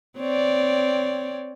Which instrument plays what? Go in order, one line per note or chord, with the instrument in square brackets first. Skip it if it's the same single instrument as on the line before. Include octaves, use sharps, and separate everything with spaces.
[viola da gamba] C4 C#5 D5